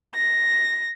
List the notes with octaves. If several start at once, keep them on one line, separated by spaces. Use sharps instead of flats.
A#6